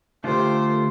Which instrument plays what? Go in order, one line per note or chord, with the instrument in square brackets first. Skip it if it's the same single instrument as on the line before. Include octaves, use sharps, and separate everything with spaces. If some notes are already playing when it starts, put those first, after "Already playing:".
[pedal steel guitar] D3 A3 F4 [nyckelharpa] G4 C5